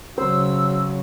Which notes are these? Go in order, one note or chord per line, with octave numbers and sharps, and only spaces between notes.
C#3 F#3 C5 E6